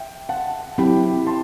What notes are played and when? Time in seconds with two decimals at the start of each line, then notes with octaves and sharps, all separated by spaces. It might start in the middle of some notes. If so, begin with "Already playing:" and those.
Already playing: E5 G5
0.29 F#5 A5
0.78 F#3 C4 E4 G4 G5 B5
1.27 A5 C6